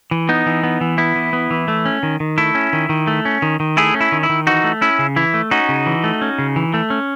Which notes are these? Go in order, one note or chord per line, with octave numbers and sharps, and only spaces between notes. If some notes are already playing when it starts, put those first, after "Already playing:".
E3
B3 D#4
E3
B3
E3
B3 E4
E3
B3
E3
A3
C#4
D#3
D#3
A3 E4
C#4
D#3
D#3
A3
C#4
D#3
D#3
A3 E4 G#4
C#4
E4
D#3
E4
D#3
E3 D#4 F#4
A3
C#4 E4
C#3
E3 E4
A3
C#4 D#4 F#4
C#3
E3
A3
C#4
C#3
E3
A3
C#4